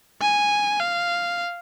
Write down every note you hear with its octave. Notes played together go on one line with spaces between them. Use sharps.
G#5
F5